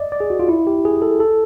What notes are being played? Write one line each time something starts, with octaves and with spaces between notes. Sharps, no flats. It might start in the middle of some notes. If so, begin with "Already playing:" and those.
Already playing: D5 D#5
D5
G#4
F#4
F4
E4
G4
G#4
A4
A4